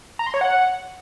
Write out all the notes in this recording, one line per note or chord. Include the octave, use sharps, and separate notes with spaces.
A#5
C6
C#5
F#5